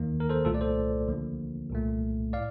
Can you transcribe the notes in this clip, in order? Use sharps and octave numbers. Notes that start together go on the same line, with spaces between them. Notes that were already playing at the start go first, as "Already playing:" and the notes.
Already playing: D#2 D#3 A#3
A#4
A4 C5
C2 A#2 A3 F4 A4
D5
A4 C5
D2 D3 F3 A#3
C2 A#2 A3
A2 D5 F5